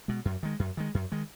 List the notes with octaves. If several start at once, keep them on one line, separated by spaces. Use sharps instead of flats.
B2 G#3
F#2
D#3 G#3
F#2
D#3 G#3
F#2
D#3 G#3